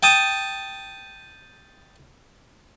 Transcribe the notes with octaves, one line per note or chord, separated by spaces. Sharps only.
G5 A5 D#6